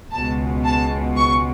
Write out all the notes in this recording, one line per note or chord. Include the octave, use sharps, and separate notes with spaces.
C#2 B2 G#3 A5
A5
C#6